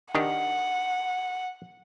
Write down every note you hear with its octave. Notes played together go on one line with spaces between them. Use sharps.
D#3 D4 G4 F#5